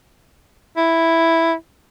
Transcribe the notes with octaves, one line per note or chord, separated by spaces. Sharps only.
E4